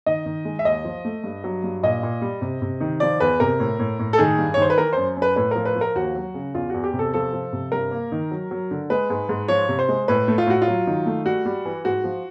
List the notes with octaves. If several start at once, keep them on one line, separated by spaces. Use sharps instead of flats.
D#3 D#5
D#3
G#3
E5
D#2 D#5
F3
A3
G2
F#3
G2
A#2 D#5
A#2
G3
C3
C3
D#3
F3 D5
E2 B4
C3 A#4
A2
A2
A2
A4
D#3 G#4
G2
C#5
D#3 C5
B4
E3 A#4
F#2 C5
F#2
B4
A2 B4
F3 A#4
B4
F3
A#4
D#2 F#4
F#3
C#3
E2 F4
E2 F#4
G4
C3
A4
F3 A4
F3
C3
G2 A#4
A#3
D#3
F#3
F#3
D3
G#3 B4
G#2
G#2
F3 C#5
C3
C5
G#3
A2 B4
A3
F4
A2 F#4
F4
F#3
D#3
A3
G3 F#4
G3
E3
G#2 F#4
F3